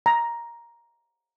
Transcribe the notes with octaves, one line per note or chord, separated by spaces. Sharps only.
A#5